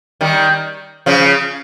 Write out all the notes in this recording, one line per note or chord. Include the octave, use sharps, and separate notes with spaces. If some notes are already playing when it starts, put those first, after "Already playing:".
D#3 G3
C#3 F3